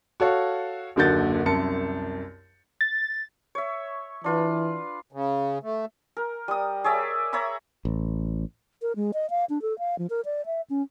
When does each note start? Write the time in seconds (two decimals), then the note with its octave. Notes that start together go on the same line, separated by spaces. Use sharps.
0.20 F#4 A4 C#5 F5
0.96 F#1 D#2 D3 F#4 G6 A6
1.45 C2 F#2 A5 C#7
2.81 A6
3.55 C#5 E5
4.24 E3 D4 F4 B4
5.12 C#3
5.63 A3
6.17 A#4
6.48 G3 D#6
6.84 G#4 C#5 D5 E5
7.33 C#5 E5 A#5 B5
7.85 A1
8.82 A#4
8.96 G#3
9.14 D#5
9.30 F5
9.50 D4
9.62 A4
9.79 F5
9.99 F3
10.10 A#4
10.25 D5
10.46 E5
10.70 C#4